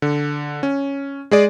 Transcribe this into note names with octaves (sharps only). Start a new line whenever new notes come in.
D3
C#4
G#3 G#4 D5